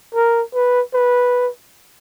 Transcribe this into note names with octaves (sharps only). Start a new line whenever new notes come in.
A#4
B4
B4